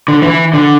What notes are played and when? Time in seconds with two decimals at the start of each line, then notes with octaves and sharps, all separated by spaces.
0.08 D3
0.22 E3
0.54 D3